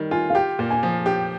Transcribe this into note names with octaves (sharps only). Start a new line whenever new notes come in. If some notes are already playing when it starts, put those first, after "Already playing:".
Already playing: D#3 G3
F4 G#5
F5
G4 G5
A#2
G#5
F3
G4 G5